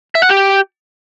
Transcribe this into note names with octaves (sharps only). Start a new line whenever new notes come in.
E5
F#5
G4